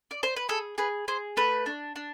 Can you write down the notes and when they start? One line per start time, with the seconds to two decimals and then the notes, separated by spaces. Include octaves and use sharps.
0.11 D5
0.23 C5
0.36 B4
0.49 G#4 A4
0.78 G#4 B4
1.08 G#4 C5
1.37 A3 B4
1.66 D4
1.96 D4